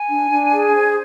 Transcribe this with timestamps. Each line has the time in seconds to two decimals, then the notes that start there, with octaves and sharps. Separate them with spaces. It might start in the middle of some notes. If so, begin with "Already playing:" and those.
Already playing: G#5
0.10 D4
0.31 D4
0.53 G#4
0.74 C5